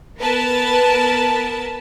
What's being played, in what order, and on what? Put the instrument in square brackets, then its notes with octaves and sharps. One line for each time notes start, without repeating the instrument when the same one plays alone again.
[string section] B3 A#4 B4 A5